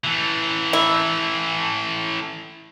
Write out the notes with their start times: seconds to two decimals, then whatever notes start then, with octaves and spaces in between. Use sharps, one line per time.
0.04 E3 A3
0.73 E4